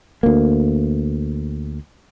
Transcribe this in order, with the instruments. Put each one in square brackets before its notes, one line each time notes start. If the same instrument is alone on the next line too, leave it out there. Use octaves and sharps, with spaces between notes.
[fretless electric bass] D2 A#3